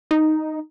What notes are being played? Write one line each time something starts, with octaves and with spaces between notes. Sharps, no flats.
D#4